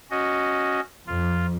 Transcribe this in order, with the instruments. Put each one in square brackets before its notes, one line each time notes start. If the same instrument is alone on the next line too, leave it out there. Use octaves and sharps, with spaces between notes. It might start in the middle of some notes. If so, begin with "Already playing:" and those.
[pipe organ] C#4 F#4 D#5
[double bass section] F2 [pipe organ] F4